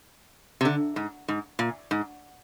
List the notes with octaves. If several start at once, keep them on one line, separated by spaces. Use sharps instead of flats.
C3
D3
G#2
G#2
A#2
G#2